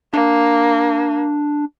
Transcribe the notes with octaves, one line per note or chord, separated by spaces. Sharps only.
A#3 D4